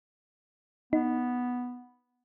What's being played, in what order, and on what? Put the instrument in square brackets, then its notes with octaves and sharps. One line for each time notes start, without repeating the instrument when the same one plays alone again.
[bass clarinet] B3 [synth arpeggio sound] D#4